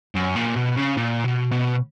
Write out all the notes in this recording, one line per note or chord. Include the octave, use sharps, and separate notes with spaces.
F#2
A#2
B2
C#3
A#2
B2
B2